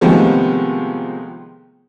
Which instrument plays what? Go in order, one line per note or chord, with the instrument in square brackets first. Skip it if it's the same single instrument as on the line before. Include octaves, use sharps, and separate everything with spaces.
[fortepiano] C3 D#3 F3 G#3 A3 B3